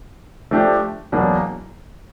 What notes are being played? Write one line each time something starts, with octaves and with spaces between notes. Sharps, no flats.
F3 A3 D4 G4
E2 B2 F#3 A#3 D4